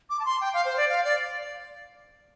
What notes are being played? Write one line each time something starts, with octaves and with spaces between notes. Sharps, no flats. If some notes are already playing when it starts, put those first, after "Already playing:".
D6
A5
C6
G5
F5
C5
D5
F5
D5